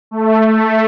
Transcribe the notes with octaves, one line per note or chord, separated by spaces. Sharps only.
A3
A3